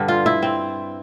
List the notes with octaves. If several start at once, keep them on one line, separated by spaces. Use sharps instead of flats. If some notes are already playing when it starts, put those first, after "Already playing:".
Already playing: G2 D3 G3
F4
E4
C4